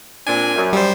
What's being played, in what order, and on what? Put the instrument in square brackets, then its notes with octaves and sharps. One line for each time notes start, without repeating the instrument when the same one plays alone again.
[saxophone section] A#2 C4 D4 [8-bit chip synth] G#5
[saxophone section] F#2
[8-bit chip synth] G3 C5